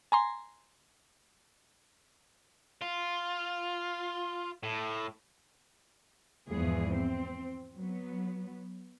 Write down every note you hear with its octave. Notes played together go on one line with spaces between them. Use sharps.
G#5 A#5 C6
F4
A2
E2 G#2 F3 B3 G#4
C4 C5
F#3 B3